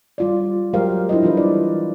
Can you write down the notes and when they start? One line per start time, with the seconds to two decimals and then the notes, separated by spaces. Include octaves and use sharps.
0.18 G3 F4 D5
0.73 F#3 G#3 G4 A#4 C5 F5
1.09 D4 E4 F4 C5 D#5
1.23 E3 G3 F4 A4 B4
1.37 D5